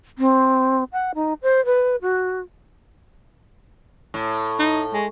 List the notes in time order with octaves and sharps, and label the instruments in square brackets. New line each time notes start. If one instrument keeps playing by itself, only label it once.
[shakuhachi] C4
F#5
D#4
C5
B4
F#4
[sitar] A2
[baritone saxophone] D#4
G#3